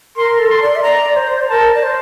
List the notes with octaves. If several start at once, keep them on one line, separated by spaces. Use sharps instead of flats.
A#4 C6
A4
C6
D5
E5
D5 A#5
C5
A#4 A5
D5
C5